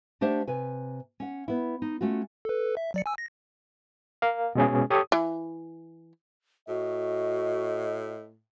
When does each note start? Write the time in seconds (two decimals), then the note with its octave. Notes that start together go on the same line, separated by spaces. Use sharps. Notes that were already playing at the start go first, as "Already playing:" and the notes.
0.21 A3 D4 G4 C5 E5 F#5
0.47 C3 B4 G#5
1.20 C#4 F#5
1.48 B3 E4
1.82 D#4
2.01 A3 C#4 F4 F#4
2.45 A4 B4
2.77 E5
2.94 F#3 D5 C#7
3.06 G#5 E6
3.18 A#6
4.22 A#4 F5
4.55 B2 G#3 C#4 G#4
4.90 G4 A4 C#5 D#6
5.12 E3
6.68 A2 F#4 D#5